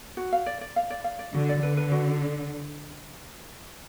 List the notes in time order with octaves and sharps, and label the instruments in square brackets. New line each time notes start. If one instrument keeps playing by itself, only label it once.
[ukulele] F#4
F5
D5
D5
F5
D5
F5
D5
[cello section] D3 [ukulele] F#4
[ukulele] D5
[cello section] D3 [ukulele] B4
[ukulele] B4
F#4